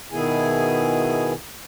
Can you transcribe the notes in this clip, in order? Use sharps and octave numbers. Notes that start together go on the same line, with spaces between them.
B2 D#3 B3 E4 G#4 G#5